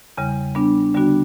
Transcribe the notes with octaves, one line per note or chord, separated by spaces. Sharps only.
E2 C#3 G3
G3 B3 D4
D3 G3 B3 D4 F#4